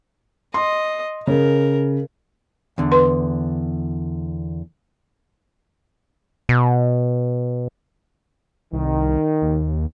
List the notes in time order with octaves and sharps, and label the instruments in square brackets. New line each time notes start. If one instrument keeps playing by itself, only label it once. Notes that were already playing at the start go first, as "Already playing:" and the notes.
[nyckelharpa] D#5 [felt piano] C6
[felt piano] C#3 [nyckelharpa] A#4
[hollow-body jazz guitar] E2 D3
[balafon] B4 C6
[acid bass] B2
[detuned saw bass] C2 [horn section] D#3
[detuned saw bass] D#2